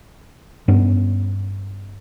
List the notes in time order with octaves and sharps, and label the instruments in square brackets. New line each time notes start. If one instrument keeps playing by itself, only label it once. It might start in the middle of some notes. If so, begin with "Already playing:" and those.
[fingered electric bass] G2 B3 C#4 D4